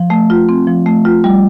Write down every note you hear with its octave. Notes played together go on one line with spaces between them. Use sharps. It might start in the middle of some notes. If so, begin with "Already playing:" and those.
Already playing: F3
A3
F4
C4
F3
A3
F4
G3